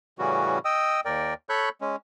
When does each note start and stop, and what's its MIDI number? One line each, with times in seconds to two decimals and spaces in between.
0.19 0.59 45
0.19 0.59 49
0.19 0.59 52
0.19 0.59 55
0.19 0.59 61
0.19 0.59 66
0.65 1.00 75
0.65 1.00 79
0.65 1.00 87
0.65 1.00 88
1.05 1.34 39
1.05 1.34 70
1.05 1.34 74
1.05 1.34 79
1.49 1.69 69
1.49 1.69 73
1.49 1.69 83
1.49 1.69 85
1.49 1.69 90
1.49 1.69 91
1.81 1.96 56
1.81 1.96 61